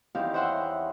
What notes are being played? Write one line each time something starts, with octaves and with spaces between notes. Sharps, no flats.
E2 D#3 C4 G4 F5
C5 C#5 E5 F#5 G5 C6